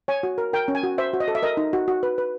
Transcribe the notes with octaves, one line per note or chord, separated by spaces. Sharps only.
C#5 G#5
F#4
A#4
A#4 G5
C#4
G#5
F#4
C5 E5
F#4
D#5
A4
E5
A#4 D#5
D#4
F#4
F#4
B4
B4